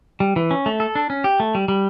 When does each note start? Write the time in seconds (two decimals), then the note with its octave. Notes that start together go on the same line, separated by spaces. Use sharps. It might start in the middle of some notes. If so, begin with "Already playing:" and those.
0.20 G3
0.36 E3
0.51 C#4
0.66 A3
0.80 A4
0.95 D4
1.10 C#4
1.24 G4
1.40 A3
1.55 G3
1.68 G3